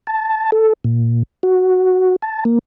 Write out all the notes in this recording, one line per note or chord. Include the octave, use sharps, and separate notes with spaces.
A5
A4
A#2
F#4
A5
A#3